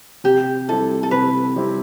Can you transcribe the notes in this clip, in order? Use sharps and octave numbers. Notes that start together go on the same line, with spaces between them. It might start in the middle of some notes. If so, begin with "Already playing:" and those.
C3 G4
G3 C4 E4 G4 A4
A4
C3 B4
G3 C4 E4 G4